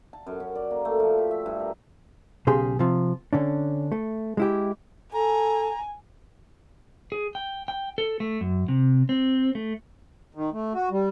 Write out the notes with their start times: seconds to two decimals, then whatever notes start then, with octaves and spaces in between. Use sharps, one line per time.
0.13 A5
0.26 F#2
0.40 C#4
0.55 D5
0.71 A#3
0.85 A3
1.00 F3
1.18 G4
1.31 E5
1.46 G2
1.60 A#4
2.47 B1 C#3 G4 G#4 C6
2.79 C3 F3
3.33 D3 C#4 D4
3.92 A3
4.37 G#3 E4 G4
5.14 A4 G#5 A#5
7.12 G#4
7.35 G5
7.68 G5
7.98 A4
8.20 A3
8.41 F#2
8.68 C3
9.09 C4
9.55 A3
10.35 D#3
10.53 A3
10.74 F#4
10.91 G3